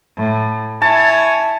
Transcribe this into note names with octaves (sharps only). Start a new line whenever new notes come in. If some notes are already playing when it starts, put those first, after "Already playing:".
A2
E4 C#5 G#5 A5